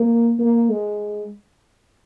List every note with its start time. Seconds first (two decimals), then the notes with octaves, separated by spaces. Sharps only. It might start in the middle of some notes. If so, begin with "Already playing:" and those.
Already playing: A#3
0.39 A#3
0.70 G#3